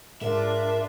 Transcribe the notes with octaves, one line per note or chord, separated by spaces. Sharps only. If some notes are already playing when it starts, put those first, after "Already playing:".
G#2 D4 F4 A#4 E5